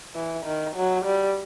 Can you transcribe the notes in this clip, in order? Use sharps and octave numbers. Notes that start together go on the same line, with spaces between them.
E3
D#3
F#3
G3